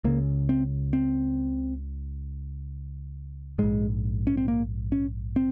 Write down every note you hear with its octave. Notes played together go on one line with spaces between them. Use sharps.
C#2 C#3 A#3
C4
C4
A#1 G#2 G#3
C#4
C4
A#3
C#4
C4